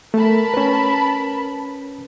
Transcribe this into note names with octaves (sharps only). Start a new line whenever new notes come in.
A3 A#4 A5 B5
C#4 B4